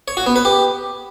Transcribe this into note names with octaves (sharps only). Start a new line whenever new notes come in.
C#5
F#4
B3
B4
G4